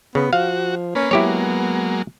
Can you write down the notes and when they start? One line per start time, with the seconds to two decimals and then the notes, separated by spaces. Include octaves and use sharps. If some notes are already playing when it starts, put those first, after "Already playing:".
0.15 C#3 B3
0.33 F3 F#4 F5
0.95 A#3 C#4 B4
1.11 F#3 G#3 A#3 B3 E4 G4 C#5